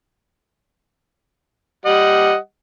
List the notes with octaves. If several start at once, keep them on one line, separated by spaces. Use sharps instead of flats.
G3 D#5 F#5